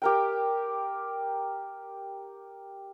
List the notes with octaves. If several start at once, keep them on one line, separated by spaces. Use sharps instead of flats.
G4 A#4 G5